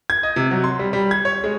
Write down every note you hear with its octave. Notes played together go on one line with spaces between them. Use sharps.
G#6
D#5
C3
F#3
C6
G3
G3
G#6
C#5
G#3